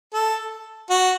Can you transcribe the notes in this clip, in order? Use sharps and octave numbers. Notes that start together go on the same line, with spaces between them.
A4
F#4